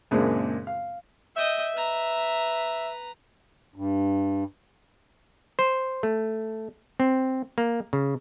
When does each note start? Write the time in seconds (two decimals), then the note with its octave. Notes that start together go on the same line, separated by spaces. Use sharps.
0.11 F#2 A#2 C#3 G#3 C4 D4
0.67 F5
1.36 D#5 E5 G5
1.74 B4 A#5
3.76 G2
5.59 C5
6.03 A3
7.00 C4
7.58 A#3
7.93 C#3